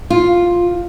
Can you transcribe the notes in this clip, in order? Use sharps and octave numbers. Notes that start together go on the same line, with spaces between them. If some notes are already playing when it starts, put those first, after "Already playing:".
F4